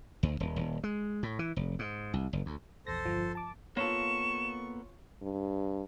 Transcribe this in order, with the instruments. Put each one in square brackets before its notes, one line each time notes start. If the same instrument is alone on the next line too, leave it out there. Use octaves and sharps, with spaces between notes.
[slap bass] D2
D#1
D#1
G#3
A2
E3
F1
G#2
C2
F#1
D2
[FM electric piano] A#1 E2 A#6 [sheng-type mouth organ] A4 C5
[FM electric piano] G1 F3
A5 D6
[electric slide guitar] A#3 B3 A4 [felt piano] F4 C#5 [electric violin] C#6 [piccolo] E7
[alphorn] G2